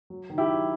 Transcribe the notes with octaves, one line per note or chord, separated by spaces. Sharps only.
F#3
D#3
E4 G4
F#3